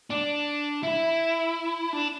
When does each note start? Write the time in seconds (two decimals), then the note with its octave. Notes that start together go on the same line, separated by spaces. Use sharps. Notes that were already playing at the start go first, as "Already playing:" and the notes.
0.10 D4
0.83 E4
1.93 D4